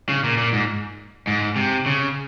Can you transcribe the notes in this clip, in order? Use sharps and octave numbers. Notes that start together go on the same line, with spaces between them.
C#3
A#2
A#2
G#2
G#2
C3
C#3